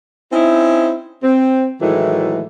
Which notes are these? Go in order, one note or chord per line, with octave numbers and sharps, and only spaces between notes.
C4 C#4 D#4 E4
C4
A2 D#3 E3 F#3 G#3 A3